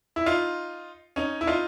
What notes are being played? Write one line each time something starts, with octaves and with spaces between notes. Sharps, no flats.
E4
D#4 F4
C#4 D#4
E4
D#4 F4